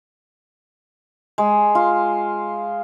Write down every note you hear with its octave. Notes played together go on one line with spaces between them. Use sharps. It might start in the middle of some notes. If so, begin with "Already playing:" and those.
G#3
F4